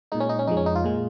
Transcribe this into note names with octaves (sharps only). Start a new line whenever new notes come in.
A#2 G#3 D#4
C#4
D#4
C#4
F2 F3 G#3 D#4
C#4
D#4
F4
A#2 G#3